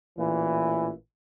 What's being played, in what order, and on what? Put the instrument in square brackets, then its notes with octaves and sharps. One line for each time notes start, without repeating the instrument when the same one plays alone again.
[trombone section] A1 A#2 E3